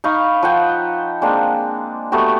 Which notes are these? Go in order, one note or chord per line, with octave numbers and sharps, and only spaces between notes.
D#4 F5 B5 C#6
F3 F#5 G5
G#3 A#3 C4 D4
A3 B3 F#4 G4